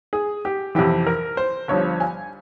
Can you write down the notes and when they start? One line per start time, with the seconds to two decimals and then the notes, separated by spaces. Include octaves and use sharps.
0.13 G#4
0.45 G4
0.75 F2 C3 E3 G4
1.06 A#4
1.37 C5
1.68 G1 G2 F3 C#5
2.00 G#5